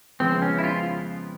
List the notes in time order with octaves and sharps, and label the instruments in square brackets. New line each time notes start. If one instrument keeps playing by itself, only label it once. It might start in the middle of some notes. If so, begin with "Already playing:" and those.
[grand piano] F2 C#3 F3 G#3 B3 [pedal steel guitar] C4
[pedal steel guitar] C#4
E4
F4